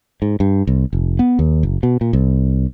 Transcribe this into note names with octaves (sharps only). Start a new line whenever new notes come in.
G#2
G2
C2
F1
B3
D#2
F#1
B2
A#2
C2